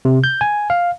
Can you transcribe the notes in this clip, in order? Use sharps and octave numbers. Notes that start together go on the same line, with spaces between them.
C3
G6
G#5
F5